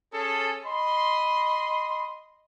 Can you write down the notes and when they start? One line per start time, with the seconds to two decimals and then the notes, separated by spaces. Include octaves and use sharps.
0.13 C#4 G#4 A4
0.65 D#5 B5 C6